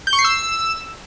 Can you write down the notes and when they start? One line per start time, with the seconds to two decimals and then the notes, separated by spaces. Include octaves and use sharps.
0.07 G6
0.13 C#6
0.19 C7
0.25 E6